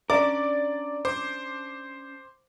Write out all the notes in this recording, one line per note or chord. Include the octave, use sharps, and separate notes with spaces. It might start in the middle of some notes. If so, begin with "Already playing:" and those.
C#4 D4 A#4 D5 D6
C5 D6